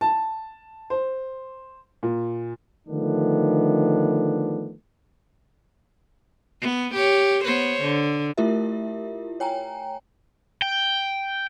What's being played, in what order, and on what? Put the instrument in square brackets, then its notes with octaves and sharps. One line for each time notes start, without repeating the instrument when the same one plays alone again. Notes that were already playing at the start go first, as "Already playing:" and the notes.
[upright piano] A5
C5
A#2
[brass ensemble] D3 D#3 F3 A3 B3 D4
[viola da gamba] B3
G4 C#5
B3 C5 C#5
D3
[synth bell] A3 E4 F4 G4 A#4 E5
C#5 G5 G#5 A#5
[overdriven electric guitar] G5